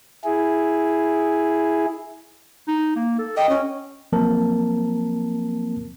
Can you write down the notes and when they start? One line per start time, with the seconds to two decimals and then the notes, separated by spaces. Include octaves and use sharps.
0.25 E4 G#4
2.68 D#4
2.96 A#3
3.19 A4
3.37 D#5 G5
3.49 C#4
4.12 F3 F#3 A#3 C4 A#4 A5